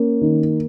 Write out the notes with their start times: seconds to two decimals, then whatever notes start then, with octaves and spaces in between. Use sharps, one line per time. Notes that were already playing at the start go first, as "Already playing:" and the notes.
Already playing: A#3 C#4
0.21 D#3